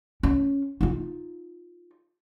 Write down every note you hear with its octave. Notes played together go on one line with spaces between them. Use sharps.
C#4
D#4 F4